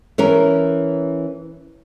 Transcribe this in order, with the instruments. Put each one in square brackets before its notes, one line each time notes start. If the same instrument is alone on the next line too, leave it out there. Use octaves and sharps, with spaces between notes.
[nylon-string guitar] E3 C#4 A#4